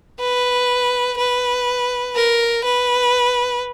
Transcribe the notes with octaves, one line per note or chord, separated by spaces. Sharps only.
B4
B4
A#4
B4